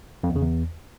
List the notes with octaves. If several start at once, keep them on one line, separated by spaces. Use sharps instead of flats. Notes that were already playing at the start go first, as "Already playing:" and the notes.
F2
E2
C#3
E2